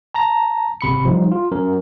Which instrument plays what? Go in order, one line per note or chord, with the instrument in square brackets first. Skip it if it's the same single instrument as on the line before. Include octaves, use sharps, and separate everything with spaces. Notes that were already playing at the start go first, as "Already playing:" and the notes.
[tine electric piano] A5 A#5 A#6
G#1 C3 B5 C#7
F3 G3 D#4
F4
F#3 C#4 A#4